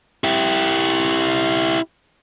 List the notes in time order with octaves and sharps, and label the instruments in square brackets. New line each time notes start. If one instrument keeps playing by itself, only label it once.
[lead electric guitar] E4 G4